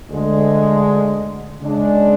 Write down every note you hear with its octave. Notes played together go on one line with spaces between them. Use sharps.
D2 D3 G#3
C#3 G#3 D4